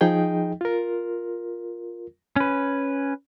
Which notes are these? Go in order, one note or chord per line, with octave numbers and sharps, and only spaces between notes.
F3 D#4 G#4 D#5 G5
F4 A#4
C#4 B4